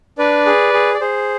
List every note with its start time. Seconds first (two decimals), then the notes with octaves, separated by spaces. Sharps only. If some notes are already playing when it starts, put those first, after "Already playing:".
0.18 D4 B4 D5
0.46 G#4
0.74 G#4
0.94 D5
1.01 G#4 C5